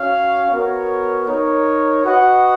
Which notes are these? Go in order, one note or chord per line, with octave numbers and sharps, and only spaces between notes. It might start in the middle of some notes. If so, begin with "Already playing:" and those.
Already playing: C#4 F#4 C#5 F5
B3 F#4 A#4 C#5
D#4 A#4 C#5
F#4 B4 D#5 F#5